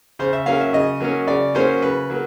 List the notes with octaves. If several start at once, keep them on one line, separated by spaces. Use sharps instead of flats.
C#3 C5
E5
F#3 A#3 C#4 F5
E5
C#3 D#5
F#3 A#3 C#4
C#3 D5
F#3 A#3 C#4 C5
C#3 B4
F#3 A#3